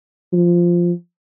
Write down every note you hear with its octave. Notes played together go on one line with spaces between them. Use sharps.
F3